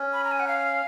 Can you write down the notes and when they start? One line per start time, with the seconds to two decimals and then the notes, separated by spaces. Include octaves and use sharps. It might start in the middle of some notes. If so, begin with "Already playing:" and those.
Already playing: C#4
0.13 B5
0.24 A#5
0.31 G#5
0.40 F#5
0.48 F5